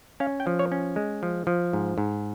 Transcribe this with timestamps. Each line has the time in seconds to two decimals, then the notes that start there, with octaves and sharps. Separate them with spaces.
0.20 C#4 F5
0.40 G5
0.47 F3
0.59 C#5
0.72 C#4
0.96 G#3
1.23 F3
1.47 F3
1.73 G#2
1.98 G#2